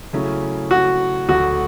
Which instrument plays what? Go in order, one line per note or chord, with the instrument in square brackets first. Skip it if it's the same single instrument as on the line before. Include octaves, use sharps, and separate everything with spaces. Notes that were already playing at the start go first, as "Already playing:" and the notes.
[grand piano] C#3 F#3 A3 C#4 E4
[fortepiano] F#4
[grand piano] D2 D3 F#3 A3 [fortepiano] F#4